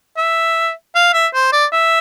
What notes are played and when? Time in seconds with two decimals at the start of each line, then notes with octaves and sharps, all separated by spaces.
0.17 E5
0.95 F5
1.14 E5
1.34 C5
1.52 D5
1.73 E5